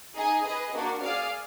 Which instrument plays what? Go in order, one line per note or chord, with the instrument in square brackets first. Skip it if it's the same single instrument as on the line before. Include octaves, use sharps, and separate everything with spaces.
[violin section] D#4 G#4 D#5 G#5
G#4 B4 D#5
A#3 D4 F#4 A#4
G#4 D5 F5